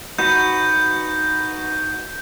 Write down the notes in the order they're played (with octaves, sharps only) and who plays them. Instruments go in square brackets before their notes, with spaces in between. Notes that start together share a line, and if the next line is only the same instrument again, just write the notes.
[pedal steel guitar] D#4 F#4 B4 [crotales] G6